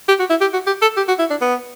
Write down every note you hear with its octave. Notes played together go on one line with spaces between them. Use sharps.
G4
F#4
E4
G4
F#4
G4
A4
G4
F#4
E4
D4
B3